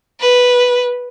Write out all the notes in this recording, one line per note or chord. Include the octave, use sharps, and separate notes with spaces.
B4